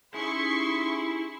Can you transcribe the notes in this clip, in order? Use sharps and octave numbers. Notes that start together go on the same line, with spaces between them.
C#4 D#4 E4 G4 G#4 C6 C#6